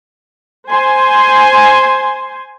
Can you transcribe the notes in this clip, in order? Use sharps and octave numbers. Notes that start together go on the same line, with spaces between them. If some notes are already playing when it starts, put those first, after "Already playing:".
C5 G#5 C6